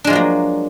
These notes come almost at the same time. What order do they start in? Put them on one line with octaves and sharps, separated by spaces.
D4 G#3 F3 F#3 A#3